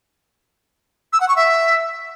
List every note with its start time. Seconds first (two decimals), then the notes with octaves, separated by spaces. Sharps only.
1.13 E6
1.20 F#5
1.28 C#6
1.36 E5